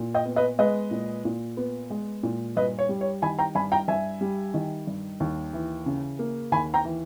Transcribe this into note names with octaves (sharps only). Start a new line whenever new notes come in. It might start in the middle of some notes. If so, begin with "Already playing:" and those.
Already playing: A#2
D#5 G5
B3
B4 D#5
G#3 B4 D#5
A#2
A#2
B3
G#3
A#2
G2 B4 D#5
C#5
G3
C#5
D#3 G#5 B5
G5 A#5
G2 G#5 B5
G5 A#5
G2 E5 G#5
G3
D#3
G2
D#2
E3
C#3
A#3
D#2 G#5 B5
G5 A#5
E3